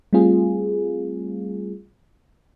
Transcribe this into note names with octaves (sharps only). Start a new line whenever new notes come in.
G3 A3 C4 F4 G#4